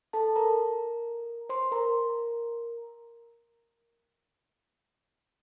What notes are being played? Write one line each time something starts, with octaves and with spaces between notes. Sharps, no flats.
A4 A5
A#4 A#5
C5 C6
A#4 A#5